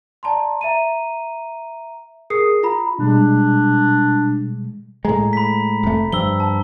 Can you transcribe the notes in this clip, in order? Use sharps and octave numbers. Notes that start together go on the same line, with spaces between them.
D5 A5 A#5 C6
E5 A#5 D#7
G#4 A#4 D#6 C7
F4 A#5 B5
B2 G3 G#3 D4
A2 G#3 A#5
B5 B6
F1 A3
G2 F3 E6 G7
A5